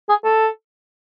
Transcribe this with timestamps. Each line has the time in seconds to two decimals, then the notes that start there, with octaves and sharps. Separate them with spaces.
0.09 G#4
0.24 A4